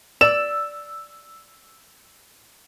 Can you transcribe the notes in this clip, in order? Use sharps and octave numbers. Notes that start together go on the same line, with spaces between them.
D5 E6 E7